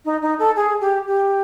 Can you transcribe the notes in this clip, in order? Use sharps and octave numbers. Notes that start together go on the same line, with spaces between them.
D#4
D#4
A4
G#4
G4
G4